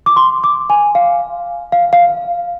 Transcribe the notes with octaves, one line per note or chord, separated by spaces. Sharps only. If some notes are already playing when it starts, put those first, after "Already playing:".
D6
C6
D6
G#5
F5
F5
F5